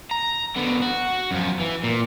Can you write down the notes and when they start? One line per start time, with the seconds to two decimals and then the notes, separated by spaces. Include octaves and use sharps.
0.11 A#5
0.56 B2 D3
0.82 F#4
1.31 F#2 F3
1.60 E3
1.84 A#2